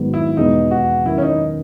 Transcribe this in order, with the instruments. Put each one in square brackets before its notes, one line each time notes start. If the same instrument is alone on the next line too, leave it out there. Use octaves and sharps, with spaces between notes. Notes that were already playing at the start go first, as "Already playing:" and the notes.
Already playing: [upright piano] G#1 G#2 F#3 B3
[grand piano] E4
[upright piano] E2 B2 G#3 [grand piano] D#4
[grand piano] F#4
[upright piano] G#1 F#2 D#3 [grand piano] E4
[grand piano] C#4
D#4